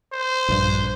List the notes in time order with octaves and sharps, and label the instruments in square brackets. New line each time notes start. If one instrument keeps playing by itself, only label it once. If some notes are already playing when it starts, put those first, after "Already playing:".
[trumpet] C5
[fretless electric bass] A#1 G2